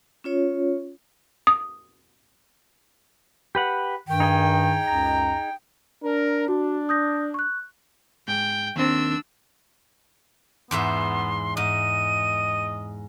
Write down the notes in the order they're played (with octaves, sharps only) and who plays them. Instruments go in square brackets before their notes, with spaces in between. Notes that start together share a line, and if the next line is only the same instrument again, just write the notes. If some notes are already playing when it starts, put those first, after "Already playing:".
[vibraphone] C#4 F4 C#5
[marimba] D#6
[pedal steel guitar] G4 B4 F#5
[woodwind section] G2 D#3 [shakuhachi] G5
[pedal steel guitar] D#4 G#4 D#5
[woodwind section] C#2 F#2 A#5
[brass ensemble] D4 A#4
[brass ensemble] D4 [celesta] F#4
[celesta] D#6 G6 A#6
C#6 F#6
[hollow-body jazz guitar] G#2 [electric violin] G5
[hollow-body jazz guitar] D#2 C4 [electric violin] D4 E6
[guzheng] E2 G#2 E5 [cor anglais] B3 [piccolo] C6
[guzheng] G#2 [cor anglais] D#5 [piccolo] D#7